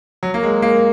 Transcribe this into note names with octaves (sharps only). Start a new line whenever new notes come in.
F#3
A#3
G#3
A#3